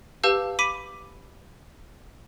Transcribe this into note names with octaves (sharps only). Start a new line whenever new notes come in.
G4 B4 F5 A5 E6 G6
B5 D6 B6 D#7